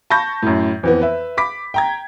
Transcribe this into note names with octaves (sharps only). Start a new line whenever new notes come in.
A5 B5 C#6 G6 A#6
F#2 A2
F2 E3 B3
B4 E5
B5 D6 B6
G5 A#5 G#6